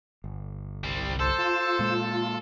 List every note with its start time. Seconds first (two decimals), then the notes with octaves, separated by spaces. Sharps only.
0.24 G1
0.84 C2 G3 C4
1.20 A4 C5 A5 E6
1.38 F4
1.79 A#2 G#3 A#3